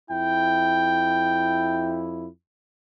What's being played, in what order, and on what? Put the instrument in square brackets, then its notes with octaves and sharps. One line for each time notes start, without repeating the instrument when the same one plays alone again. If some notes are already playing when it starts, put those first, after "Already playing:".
[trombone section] F2 E4 [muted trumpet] G5